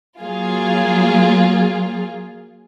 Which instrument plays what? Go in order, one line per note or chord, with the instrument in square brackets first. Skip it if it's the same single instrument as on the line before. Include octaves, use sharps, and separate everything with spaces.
[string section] F#3 A#3 F4 G#4